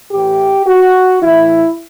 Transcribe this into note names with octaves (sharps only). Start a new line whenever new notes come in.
A2 E3 G4
F#4
A2 E3 E4